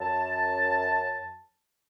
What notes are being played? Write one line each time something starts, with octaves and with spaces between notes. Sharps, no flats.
F#2 A5